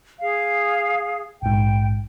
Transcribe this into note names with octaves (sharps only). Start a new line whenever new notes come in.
G#4 F5
A#1 G#2 G5